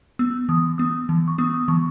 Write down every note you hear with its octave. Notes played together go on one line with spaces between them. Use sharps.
B3 E6
E3 D#6
B3 D#6
E3
C#6
B3 D#6
D#6
E3 C#6